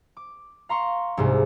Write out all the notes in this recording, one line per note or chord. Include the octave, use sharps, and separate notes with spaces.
D6
F5 A#5 C6 C#6
C2 G#2 C3